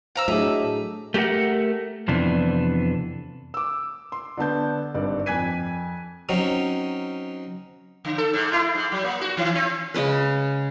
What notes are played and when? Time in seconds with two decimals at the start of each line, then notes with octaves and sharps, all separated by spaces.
0.16 C5 F5 A#5 E6
0.28 A2 F#3 D4 G#4 D#5 E5 A5
1.14 A3 G4 A4 A#4 F#5
2.08 F2 C3 E3 B3 D4
3.54 D6 E6
4.12 C6
4.38 D3 B3 A5 G6
4.94 G#1 G2 D5
5.26 F2 G#5 F#6 G#6 B6 D#7
6.29 F#3 C4 C#4 D#4
8.05 D3
8.18 A4
8.33 G#2
8.53 E4
8.75 G#2
8.92 F#3
9.04 A#3
9.21 F#4
9.37 D#3
9.55 C4
9.94 C#3 G#3 C#4 B4